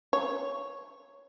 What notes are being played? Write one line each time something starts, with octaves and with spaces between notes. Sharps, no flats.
C#5